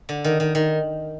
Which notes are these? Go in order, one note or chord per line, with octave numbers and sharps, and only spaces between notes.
D3
D#3
D#3
D#3